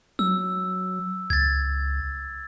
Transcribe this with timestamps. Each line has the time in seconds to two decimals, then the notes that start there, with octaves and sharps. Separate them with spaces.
0.19 F#3 E6
1.30 C#2 G#6 A6